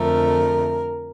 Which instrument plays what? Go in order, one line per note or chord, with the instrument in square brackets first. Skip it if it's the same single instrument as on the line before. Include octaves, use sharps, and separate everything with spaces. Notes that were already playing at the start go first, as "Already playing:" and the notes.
Already playing: [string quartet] F2 D3 F3 A3 A#4